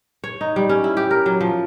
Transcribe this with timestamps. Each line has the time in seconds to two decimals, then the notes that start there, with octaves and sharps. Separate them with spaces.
0.24 C#5
0.41 D#4
0.56 G3
0.69 C#4
0.84 E4
0.97 G4
1.11 A#4
1.26 F#3
1.41 F3